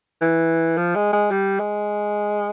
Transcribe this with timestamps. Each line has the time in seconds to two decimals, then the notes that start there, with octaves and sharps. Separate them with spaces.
0.21 E3
0.77 F3
0.95 G#3
1.13 G#3
1.31 G3
1.60 G#3